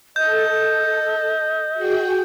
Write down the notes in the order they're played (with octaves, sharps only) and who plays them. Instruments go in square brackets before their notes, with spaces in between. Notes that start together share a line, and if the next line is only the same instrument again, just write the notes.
[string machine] A4 [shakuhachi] D#5 [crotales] G6
[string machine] F#4 G#4 G5